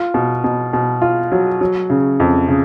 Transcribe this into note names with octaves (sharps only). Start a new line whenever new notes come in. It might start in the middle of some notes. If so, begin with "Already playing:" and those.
Already playing: F4
B2
B2
B2
F4
F#3
F#3
C#3
F2
C#3